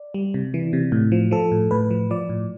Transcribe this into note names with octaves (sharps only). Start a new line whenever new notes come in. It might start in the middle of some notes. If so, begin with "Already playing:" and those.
Already playing: D5
G3
C3
E3
C3
A2
F3
F3 A4
A2
A2 B4
F3
F3 D5
A2